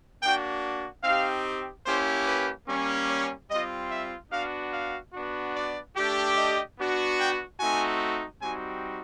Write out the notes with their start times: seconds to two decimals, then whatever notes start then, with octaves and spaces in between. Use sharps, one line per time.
0.22 A#3 D4 F#4 G5
1.04 C4 D#4 G4 F5
1.86 A#3 C#4 E4 G4 C5
2.27 B4
2.68 G3 A#3 C#4
3.09 C#5
3.50 G3 C4 F4 D#5
3.91 E5
4.31 B3 D4 F#4 F5
4.73 F5
5.13 B3 D4 F#4
5.55 D5
5.96 A3 D4 G4
6.37 D#5
6.78 B3 D4 F#4
7.19 G5
7.60 A3 C4 D#4 F#4 G#5
8.41 G3 C4 D#4 F#4 G#5